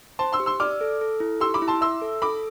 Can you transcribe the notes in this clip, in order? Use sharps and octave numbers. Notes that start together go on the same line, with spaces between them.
C5 A5 C6
C6 E6
G4
C6 E6
D5 D6 F6
A4
A4
E4
G4 C6 E6
B5 D6
E4
A5 C6
E5 C6 E6
A4
A4 B5 D6